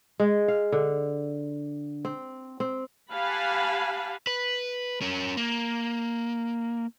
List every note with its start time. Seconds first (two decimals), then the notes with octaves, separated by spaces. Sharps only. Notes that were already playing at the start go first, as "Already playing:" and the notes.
0.20 G#3
0.48 F5
0.72 D3
2.05 C4
2.60 C4
3.12 G4 F5 F#5 G#5 A5 B5
4.27 B4
5.01 C#4 A#4
5.37 A#3